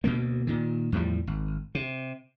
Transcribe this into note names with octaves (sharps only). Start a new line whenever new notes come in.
D2 B2 G#3 A#3
A#2 D#3
E2 A2 F3 G3
G#1
C3